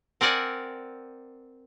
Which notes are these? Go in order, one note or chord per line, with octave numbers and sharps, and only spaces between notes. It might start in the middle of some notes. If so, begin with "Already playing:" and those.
C4 A#4 D5 F#5 G#5